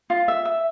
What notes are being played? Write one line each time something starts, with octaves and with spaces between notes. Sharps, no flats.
F4
E5
E5